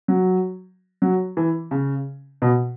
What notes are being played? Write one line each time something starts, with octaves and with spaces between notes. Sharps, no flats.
F#3
F#3
E3
C#3
B2